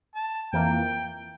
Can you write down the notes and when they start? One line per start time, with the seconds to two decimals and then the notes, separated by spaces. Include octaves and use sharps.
0.15 A5
0.53 F2 E3 A#3 G5